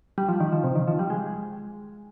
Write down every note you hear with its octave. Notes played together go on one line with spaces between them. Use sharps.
G3
F3
D#3
F3
C3
D#3
F3
G3
G#3